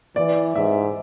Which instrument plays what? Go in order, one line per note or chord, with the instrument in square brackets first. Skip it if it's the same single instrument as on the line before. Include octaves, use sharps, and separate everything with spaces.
[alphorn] E3 [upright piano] D5
[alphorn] G#2 [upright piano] E5